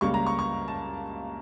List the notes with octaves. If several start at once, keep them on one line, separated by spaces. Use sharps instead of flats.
C#2 C#3 G3 A#3 C#6
A#5
C#6
C#6
A5